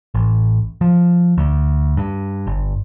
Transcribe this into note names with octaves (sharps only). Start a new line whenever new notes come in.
A1
F3
D2
G2
G1